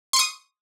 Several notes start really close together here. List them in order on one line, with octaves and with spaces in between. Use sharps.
C6 C#6 D#6